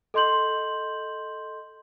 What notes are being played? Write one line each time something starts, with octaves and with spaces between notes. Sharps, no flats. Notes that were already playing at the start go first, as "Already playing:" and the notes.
A4 D#5 C6 G6 F#7